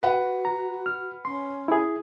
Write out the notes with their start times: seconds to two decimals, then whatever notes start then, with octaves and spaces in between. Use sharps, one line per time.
0.03 F#4 B4 F#5
0.45 A#5
0.86 F6
1.25 C#4 C6
1.68 E4 G#4